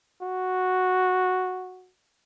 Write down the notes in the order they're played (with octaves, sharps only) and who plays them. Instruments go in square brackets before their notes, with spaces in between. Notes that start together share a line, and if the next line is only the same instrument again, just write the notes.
[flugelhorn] F#4